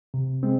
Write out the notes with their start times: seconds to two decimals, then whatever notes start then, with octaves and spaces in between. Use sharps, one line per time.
0.14 C3
0.43 G#3 C4